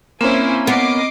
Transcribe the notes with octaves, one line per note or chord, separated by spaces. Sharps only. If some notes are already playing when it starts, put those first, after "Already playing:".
A#3 C4 C#4 E4 C5 G#5
B3 D#5 D6 C7